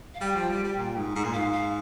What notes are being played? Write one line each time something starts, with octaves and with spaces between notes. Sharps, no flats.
F5
G3 G5
F3
G3
G3
A#2
G#2
G#2
A#2
G#2 F5
F5